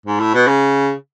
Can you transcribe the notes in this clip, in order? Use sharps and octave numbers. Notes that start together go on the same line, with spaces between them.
G#2
A2
B2
C#3